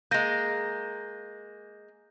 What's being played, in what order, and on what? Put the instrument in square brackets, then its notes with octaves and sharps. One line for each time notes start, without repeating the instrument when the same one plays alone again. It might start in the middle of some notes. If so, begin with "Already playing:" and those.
[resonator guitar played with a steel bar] G#3 A#3 [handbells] G6 A#6